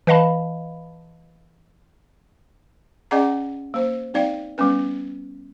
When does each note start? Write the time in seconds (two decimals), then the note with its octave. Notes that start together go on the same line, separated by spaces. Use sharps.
0.07 E3 B4 D#5 F5 A5 B5
3.11 C#4 G#4 D5 D#5 F#5 A#5
3.74 A#3 C5
4.14 C4 D#4 D5 F5 G5
4.58 G3 B3 C#4 B4